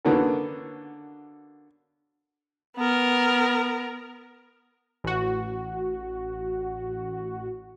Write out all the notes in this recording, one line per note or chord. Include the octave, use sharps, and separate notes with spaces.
D3 A#3 B3 C#4 F#4 A4
B3 A#4
A1 F#4